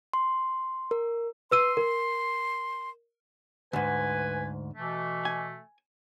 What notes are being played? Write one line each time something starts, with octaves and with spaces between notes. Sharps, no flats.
C6
A#4
B4 C6 E6 D#7
A#4
D2 G#2 B4 G#5
B2 E3 A3
G#5